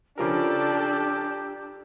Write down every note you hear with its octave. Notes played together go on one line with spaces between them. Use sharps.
C#3 F3 D4 G4 A4 A#4